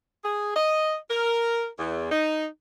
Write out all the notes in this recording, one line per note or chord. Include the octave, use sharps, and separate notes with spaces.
G#4
D#5
A#4
E2
D#4